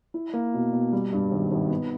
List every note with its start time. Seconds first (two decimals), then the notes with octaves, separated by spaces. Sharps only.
0.14 E4
0.33 A#3
0.54 B2
0.73 B2
0.92 G3
1.13 G2
1.32 G#1
1.51 G#1
1.70 B3